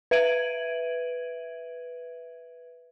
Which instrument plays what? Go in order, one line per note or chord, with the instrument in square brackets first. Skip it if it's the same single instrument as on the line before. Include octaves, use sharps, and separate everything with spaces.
[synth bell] B4 E5 G#6 D7 D#7 F#7